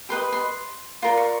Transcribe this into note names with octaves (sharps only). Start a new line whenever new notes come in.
G4 B4 D#5 C6
C6
F4 A#4 D5 C6
C#6